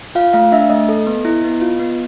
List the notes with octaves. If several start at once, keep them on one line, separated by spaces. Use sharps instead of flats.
F4 F5
A3 F5
D4 E5
A3 D#5
A4
B3
E4
B3
F4
B3